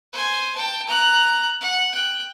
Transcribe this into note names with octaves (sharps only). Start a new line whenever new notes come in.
C5 G#5
G5 A5
A#5 F#6
F#5
G5 F#6